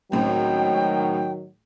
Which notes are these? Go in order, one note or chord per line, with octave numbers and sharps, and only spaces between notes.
C#2 A2 D#3 F#3 C4 G5